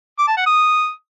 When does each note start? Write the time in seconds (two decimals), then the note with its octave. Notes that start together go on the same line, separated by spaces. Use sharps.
0.18 D6
0.28 A5
0.37 F#5
0.46 D#6